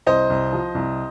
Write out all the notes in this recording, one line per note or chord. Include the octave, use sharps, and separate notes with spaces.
C2 C5 D#5
C2
F3
C2